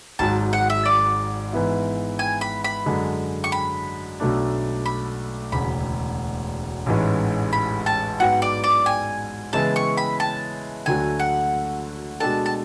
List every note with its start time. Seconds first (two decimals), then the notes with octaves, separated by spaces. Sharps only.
0.19 G#1 G#2 F#3 A5
0.53 F#5
0.70 E5
0.85 D5
1.53 G#2 E3 B3 E4
2.19 G#5
2.41 B5
2.64 B5
2.86 F#2 D3 G#3
3.44 C#6
3.52 B5
4.20 B1 B2 A3 D4
4.86 B5
5.52 E1 D2 C#3 B5
6.86 A1 G#2 E3 G#3 C#4
7.53 B5
7.86 A5
8.20 G#2 F#3 B3 F#5
8.42 D5
8.64 D5
8.86 G#5
9.53 C#3 E3 G#3 B3 E4 A5
9.76 C#6
9.97 B5
10.20 A5
10.86 D2 D3 F#3 A3 G#5
11.20 F#5
12.20 B2 G#3 D4 A4 A5
12.46 A5